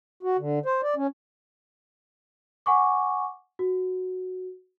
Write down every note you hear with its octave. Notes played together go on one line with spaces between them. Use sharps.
F#4
D3
C5
D5
C#4
F#5 G#5 C#6 D6
F#4